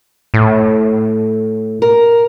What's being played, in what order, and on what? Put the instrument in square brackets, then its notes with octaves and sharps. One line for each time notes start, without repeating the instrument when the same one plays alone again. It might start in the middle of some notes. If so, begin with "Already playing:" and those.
[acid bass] A2
[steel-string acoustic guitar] A#4